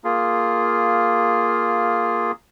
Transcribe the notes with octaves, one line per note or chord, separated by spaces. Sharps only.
A#3 F4 G#4